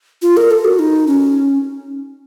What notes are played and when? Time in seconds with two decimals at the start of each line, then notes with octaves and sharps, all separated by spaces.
0.22 F4
0.37 A#4
0.51 A4
0.64 F#4
0.79 D#4
1.07 C#4